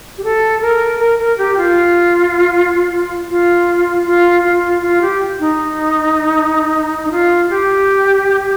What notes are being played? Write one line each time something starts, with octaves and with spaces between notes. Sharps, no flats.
G4
A4
A#4
A#4
A#4
G4
F4
F4
F4
F4
F4
G4
D#4
D#4
F4
G4